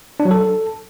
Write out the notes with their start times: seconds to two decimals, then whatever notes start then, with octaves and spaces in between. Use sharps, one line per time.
0.20 D4
0.25 F#3
0.31 A4